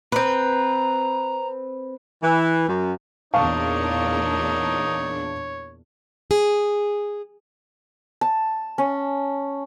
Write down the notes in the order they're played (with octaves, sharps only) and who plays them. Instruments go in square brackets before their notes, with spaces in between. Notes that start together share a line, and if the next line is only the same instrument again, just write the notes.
[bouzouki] C4 B4 [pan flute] A#5
[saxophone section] E3
F#2
[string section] E2 A#2 D4 [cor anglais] D#4 [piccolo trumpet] C#5 [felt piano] F5 A5 C#6
[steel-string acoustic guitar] G#4
[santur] A5
C#4